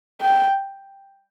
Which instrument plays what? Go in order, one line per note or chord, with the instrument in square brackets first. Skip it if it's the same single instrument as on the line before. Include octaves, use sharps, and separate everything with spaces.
[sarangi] G5